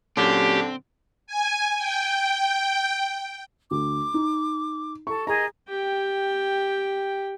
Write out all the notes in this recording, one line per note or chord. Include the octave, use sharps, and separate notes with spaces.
A#2 D3 F#3 C4 C#4 G4
G#5
G5
D2 D6
D#4
A4 C#6
G#4 A#4 D#5 A#5
G4 G5